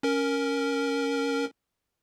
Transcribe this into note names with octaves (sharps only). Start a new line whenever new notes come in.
C#4 A#4